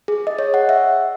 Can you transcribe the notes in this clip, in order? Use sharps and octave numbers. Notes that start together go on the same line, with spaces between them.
G#4
D#5
C#5
F#5
E5